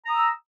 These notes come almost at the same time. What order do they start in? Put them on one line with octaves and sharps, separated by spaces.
A#5 D#6 E6